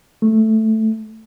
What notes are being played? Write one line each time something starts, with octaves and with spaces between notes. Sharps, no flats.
A3